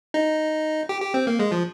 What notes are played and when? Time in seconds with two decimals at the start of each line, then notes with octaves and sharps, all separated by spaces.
0.14 D#4
0.89 G4
1.02 G4
1.14 C4
1.27 A#3
1.39 G#3
1.51 F3